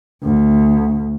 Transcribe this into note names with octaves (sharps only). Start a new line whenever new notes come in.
D2